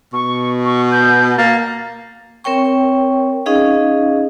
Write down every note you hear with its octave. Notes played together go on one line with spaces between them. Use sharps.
B2 C#6
C#6
G6
A#3 A6
C4 A#4 C#5 G5 C#6
C#4 D#4 G#4 D#5 F5